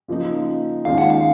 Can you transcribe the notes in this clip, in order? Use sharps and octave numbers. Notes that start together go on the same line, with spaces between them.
C#3 F3 A#3 D#4
D#2 D#3 G#3 C#4 F4 F5
F#5
F5